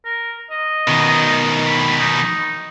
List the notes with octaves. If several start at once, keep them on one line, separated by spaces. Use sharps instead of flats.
A#4
D#5
B2 D#3
B5
D#4